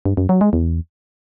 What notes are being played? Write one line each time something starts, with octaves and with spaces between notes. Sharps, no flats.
G2
F#2
F#3
G#3
E2